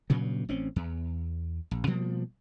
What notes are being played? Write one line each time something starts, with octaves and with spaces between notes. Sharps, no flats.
G2 A#2 C#3 F#3
A1 C4 C#4
E2
A#1
B2 F3 G3 A#3